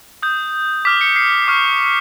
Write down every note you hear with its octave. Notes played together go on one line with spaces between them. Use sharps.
D#6 G6
D6 F6 B6
C#7
C7
C#6 F6